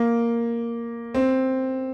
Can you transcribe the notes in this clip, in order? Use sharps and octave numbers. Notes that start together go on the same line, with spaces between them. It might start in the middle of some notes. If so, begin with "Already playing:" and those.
Already playing: A#3
C4